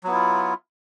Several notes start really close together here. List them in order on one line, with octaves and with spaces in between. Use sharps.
F#3 B3 E4 F4